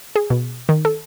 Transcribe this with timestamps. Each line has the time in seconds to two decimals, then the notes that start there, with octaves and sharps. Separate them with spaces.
0.16 G#4
0.30 B2
0.69 D#3
0.85 A4